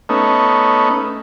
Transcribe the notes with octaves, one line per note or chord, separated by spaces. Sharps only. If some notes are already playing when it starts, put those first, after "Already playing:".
A3 B3 C#4 D#4